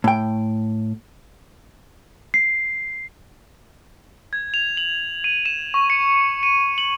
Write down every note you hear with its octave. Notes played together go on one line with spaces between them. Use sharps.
A2 G5
C7
G#6
F7
F#7
D#7
E7
C#6
C#7
D#7
F#7